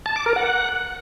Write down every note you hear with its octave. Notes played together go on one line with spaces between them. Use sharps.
A5
D6
A#4
F#5